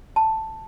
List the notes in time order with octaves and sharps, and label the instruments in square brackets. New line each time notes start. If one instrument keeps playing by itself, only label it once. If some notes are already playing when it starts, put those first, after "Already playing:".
[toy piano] A5